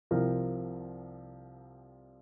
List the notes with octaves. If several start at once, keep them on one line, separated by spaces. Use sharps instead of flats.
C2 C3 F3 C4 A#4